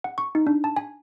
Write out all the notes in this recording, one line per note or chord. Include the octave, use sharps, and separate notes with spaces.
F#5
C#6
D#4
D4
A5
G#5